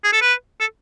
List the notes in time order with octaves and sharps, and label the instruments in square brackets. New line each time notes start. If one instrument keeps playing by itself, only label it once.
[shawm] G#4
A4
B4
A4